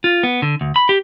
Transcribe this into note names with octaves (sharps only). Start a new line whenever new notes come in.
F4
B3
D3
D2
B5
G4